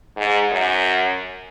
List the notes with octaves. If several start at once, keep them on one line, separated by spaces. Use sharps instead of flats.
G#2
F#2